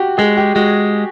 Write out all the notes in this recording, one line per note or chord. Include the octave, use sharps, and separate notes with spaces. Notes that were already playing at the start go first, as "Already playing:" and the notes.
Already playing: F#4 G4
G#3 G#4
G4
G#3 F#4